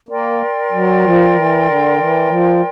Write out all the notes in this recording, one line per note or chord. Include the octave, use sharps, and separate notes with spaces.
A#3 A#4 D5 G5 C6
F#3
F3
E3
D3
E3
F3